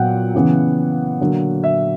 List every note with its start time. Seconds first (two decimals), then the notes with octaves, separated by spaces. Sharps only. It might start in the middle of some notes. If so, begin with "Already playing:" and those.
Already playing: A#2 F#3 B3 F#5 G5
0.35 C#3 E3 B3
1.20 D3 F#3 A#3
1.64 E5